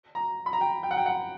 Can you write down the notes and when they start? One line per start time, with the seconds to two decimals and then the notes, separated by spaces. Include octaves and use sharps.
0.15 A#5
0.46 B5
0.53 A#5
0.61 G5
0.83 G5
0.91 F#5
0.97 G5
1.06 F#5